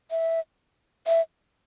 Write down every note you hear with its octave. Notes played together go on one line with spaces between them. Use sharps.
E5
E5